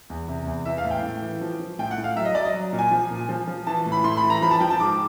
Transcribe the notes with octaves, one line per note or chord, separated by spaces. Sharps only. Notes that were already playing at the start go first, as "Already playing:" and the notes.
E2
C3
E2
E3 E5
F5
A2
G5
A2
E3
F3
F3
A2 G5
F#5
A2
F5
F#3 E5
D#5
F#3 D5
D#5
F#3
A#2
G#5
F3
A#2
F3
F3
E3 A5
A2
B5
A2 C6
B5
E3
A#5
F3 B5
A5
F3 G5
A5
G#2 D6